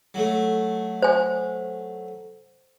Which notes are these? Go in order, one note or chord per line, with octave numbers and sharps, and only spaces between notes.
F#3 A3
C5 G#5